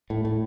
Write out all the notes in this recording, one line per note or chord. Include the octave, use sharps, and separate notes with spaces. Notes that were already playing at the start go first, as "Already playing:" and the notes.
A2
A2